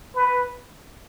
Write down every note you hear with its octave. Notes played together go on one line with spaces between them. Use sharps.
B4